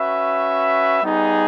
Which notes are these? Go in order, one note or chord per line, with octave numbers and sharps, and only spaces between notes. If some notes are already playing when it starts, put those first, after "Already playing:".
Already playing: C#4 F#4 B4 E5
G3 B3 D#4 G#4